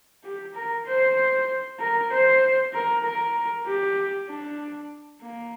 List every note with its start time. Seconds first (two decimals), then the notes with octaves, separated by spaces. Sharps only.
0.24 G4
0.55 A#4
0.86 C5
1.79 A#4
2.11 C5
2.73 A#4
3.04 A#4
3.66 G4
4.29 D4
5.22 A#3